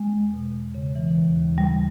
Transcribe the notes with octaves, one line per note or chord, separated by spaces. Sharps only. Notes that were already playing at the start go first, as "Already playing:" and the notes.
Already playing: G#3
E2
B2
E2
C#3
E3
D#2
D#2
C#3 G3